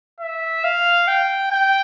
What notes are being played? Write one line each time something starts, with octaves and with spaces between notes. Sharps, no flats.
E5
F5
G5
G5